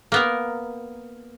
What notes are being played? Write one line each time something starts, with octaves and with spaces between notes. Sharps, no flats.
A#3 B3 A#4